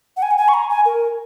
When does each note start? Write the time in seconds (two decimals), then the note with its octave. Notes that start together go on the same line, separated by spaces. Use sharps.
0.17 F#5
0.22 G#5
0.31 F#5
0.37 G#5
0.48 C#6
0.54 A#5
0.70 G#5
0.85 A#4